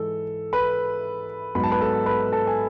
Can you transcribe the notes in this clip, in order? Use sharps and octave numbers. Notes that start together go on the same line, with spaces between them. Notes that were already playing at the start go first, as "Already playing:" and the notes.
Already playing: G#2 E3 G#3 A4
B4 B5
G#2 F#3 B3 B5
A5
B4 B5
A4 A5
B4 B5
A4 A5
G#5